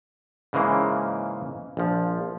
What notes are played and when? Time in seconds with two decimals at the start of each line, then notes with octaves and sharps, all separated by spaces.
0.53 G#2 C#3 E3 G#3 A#3
1.77 A#1 F3